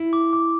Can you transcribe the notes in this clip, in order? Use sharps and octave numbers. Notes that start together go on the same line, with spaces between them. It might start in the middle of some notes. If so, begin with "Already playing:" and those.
Already playing: E4
D6
D6